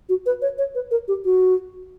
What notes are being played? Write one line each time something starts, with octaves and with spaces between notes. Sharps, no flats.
F#4
B4
C#5
C#5
B4
A#4
G4
F#4